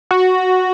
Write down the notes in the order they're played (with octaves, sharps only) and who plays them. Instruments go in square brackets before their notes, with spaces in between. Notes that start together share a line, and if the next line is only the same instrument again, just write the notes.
[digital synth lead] F#4